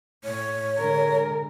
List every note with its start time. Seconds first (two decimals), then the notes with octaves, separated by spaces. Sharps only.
0.24 A2 C#5
0.79 D3 G#3 A#4